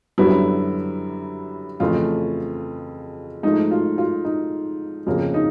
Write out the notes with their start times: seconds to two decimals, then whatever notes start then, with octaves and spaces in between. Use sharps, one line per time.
0.18 F#2 D3 G3 B3 E4
1.80 F2 C#3 E3 A3 F4
3.43 G#2 F3 A3 D#4
3.71 F4
3.98 F4
4.25 D#4
5.07 F2 C#3 F3 A#3
5.34 D#4